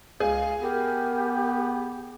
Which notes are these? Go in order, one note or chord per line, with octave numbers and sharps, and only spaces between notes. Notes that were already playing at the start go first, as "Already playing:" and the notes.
C#2 G#4 F5
B3 G4 A#4